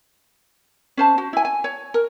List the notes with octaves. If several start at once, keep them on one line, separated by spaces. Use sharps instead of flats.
C#4 C5 A5
F#4
E4 G#5
G#5
C#5
A#4